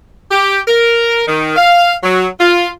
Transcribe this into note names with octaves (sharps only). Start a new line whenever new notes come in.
G4
A#4
D#3
F5
F#3
F4